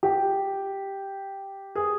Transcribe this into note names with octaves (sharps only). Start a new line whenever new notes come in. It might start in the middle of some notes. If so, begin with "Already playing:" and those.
G4
G#4